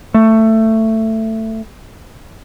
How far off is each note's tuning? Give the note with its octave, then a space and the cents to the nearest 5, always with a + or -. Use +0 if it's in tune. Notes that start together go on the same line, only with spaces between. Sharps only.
A3 +15